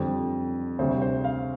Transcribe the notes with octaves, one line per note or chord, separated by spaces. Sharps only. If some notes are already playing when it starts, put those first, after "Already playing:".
Already playing: F2 D3 G3 C5
D2 C3 G3 C5
C5
F5